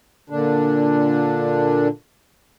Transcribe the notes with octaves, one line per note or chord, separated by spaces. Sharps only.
A#2 D3 D4